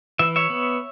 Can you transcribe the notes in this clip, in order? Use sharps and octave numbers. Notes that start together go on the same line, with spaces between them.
E3 E5
C#5 E5
B3